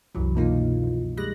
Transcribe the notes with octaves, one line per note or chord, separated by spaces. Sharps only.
C2 F#2 E3 F#3
F#2 B2 A#3 D#4 F4
F2
G3 G#3 F#6 A#6